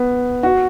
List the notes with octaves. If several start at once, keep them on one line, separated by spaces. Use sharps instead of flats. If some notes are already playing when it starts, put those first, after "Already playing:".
Already playing: B3
F#4